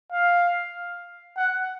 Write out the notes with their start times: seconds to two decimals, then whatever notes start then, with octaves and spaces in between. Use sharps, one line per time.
0.12 F5
1.37 F#5